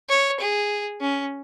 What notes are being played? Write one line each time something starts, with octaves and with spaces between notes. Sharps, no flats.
C#5
G#4
C#4